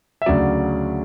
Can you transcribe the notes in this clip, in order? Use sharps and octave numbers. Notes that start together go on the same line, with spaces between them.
E5
D2 C#3 F#3 D5